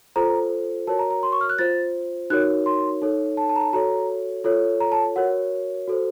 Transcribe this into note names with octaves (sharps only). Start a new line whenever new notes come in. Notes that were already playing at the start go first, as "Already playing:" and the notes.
F4 A4 C5 A#5
F#4 A#4 C#5 A5
A#5
A#5
C6
C#6
F6
F#6
F4 C5 A6
D#4 F#4 A#4 C#5 F#6
C6
D#4 A4 C#5
A5
A5
A#5
A5
F#4 A4 C#5 A#5
F4 A4 C#5
A#5
A5
F#4 A#4 C#5 F#5
F#4 A4 C5